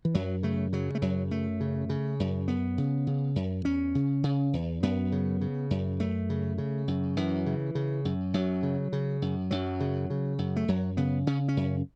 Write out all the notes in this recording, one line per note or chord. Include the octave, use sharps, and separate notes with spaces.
E3
F#2 F#3
C#3 A3
C#3 F#3
A3
F#2 F#3
F#2 A3
C#3
C#3
F#2
F#2 B3
C#3
C#3
F#2
E2 C#4
C#3
C#3
E2
F#2 B3
C#3
C#3
F#2
F#2 A3
C#3
C#3
F#2
F#2 E3
C#3
C#3
F#2
F#2 F#3
C#3
C#3
F#2
F#2 F#3
C#3
C#3
F#2
A3
F#2 F#3
C#3 B3
C#3 C#4
C#4
F#2